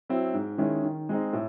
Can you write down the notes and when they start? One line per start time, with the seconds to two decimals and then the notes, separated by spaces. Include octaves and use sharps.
0.10 F#3 C4 E4
0.34 G#2
0.58 D#3 G#3 C#4 E4
0.84 D#3
1.09 G#3 C4 D#4
1.33 A2